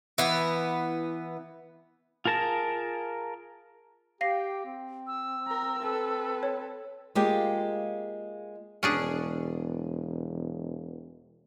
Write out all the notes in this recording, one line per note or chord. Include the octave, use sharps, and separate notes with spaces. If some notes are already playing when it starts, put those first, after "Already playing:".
E3 B3
F4 G#4 A#4 A5 A#5
G4 F5 G5 A#6 C7
C4
E6
A#4 A#5
A4 B4
C#5
G#3 A#3 F4 G4
E1 C#4 D4 G#4